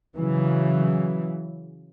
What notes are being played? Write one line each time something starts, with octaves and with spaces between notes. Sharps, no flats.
C#3 E3 F#3